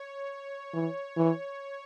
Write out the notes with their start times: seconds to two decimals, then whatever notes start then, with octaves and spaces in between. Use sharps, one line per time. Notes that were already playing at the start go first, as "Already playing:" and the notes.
Already playing: C#5
0.73 E3
1.17 E3